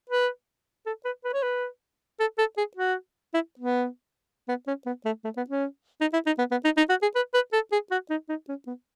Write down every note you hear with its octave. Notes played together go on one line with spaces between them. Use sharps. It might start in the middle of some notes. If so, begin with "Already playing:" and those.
B4
A4
B4
B4
C#5
B4
A4
A4
G#4
F#4
E4
B3
B3
C#4
B3
A3
A3
B3
C#4
D#4
E4
D#4
B3
B3
D#4
D#4
F#4
G#4
B4
B4
A4
G#4
F#4
D#4
D#4
C#4
B3